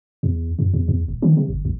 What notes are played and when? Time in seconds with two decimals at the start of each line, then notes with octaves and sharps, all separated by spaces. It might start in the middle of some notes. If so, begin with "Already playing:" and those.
0.23 E2
0.59 F#2
0.73 E2
0.88 E2
1.08 D#1
1.22 D#3
1.37 C3
1.49 G1
1.65 A#1